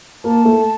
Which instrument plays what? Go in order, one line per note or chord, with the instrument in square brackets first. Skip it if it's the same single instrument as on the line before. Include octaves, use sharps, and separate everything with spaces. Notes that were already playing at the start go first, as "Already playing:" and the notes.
[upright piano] A#3 [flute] A5
[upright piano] A3